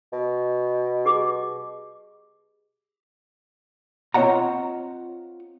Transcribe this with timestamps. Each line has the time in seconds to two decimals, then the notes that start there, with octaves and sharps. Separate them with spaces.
0.13 B2
1.05 G4 G#4 D6
4.14 C4 F4 C#5 D#5 F#5 A#5